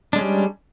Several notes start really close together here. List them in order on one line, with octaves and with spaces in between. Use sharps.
D4 G#3 C#4 G3